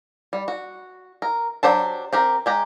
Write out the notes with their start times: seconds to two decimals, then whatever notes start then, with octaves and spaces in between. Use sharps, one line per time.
0.33 G3
0.48 F#4
1.22 A#4
1.63 F#3 D4 G4 C5 A5
2.13 C4 G4 A#4
2.46 G#3 G4 A#5